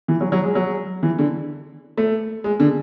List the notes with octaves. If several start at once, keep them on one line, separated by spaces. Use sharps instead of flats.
E3
F#3
F#3
G#3
F#3
E3
D3
A3
G#3
D3